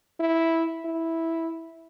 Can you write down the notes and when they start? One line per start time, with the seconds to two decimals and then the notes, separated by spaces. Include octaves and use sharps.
0.20 E4
0.85 E4